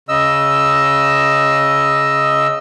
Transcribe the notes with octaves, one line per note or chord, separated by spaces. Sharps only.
C#3 D#5 E6